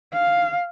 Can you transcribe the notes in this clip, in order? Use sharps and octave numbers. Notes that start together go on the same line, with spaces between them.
F5